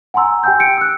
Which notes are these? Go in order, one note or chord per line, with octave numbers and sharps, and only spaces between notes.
F#5 G#5 A#5 C6 E6
G4 G5 G#5 E6 G6
C#7 D7
E6 F#6